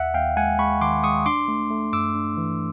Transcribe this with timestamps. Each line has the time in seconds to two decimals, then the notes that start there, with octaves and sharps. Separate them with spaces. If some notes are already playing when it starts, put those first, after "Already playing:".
Already playing: D#2 E5 F#5
0.14 D#2 F5 G5
0.37 G#3 F#5 G#5
0.59 G#3 B5 C#6
0.81 D#3 C6 D6
1.03 G#3 C#6 D#6
1.26 D4 C6 D6
1.48 A3
1.70 A3
1.93 G2 D6 E6
2.15 D4
2.37 E3